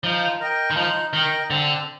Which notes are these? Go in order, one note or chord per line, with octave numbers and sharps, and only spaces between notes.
F3 D#4
A#4 D#5 G5
D#3
F3 D#4
D#3 A#4 D#5 G5
D3 C4